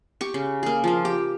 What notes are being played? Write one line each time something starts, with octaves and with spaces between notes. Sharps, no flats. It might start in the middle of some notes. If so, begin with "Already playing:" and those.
G4 C#6
C#3
A#3 G#4
F3 A#3
G4